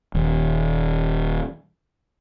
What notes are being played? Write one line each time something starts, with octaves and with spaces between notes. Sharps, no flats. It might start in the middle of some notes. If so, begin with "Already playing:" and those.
D#1 D#2